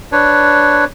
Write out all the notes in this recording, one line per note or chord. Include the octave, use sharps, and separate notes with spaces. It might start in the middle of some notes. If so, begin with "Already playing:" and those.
D4 B4 C#5